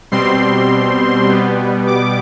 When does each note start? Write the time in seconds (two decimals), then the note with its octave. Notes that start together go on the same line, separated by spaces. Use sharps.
0.11 B2 G3 C4 C6
1.28 B2 G3 B3
1.87 D6